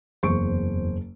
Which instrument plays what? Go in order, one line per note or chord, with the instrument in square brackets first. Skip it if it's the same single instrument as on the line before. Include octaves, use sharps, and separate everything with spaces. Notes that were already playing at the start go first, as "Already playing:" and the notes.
[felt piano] F#1 C#6 D7 [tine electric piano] E2 C5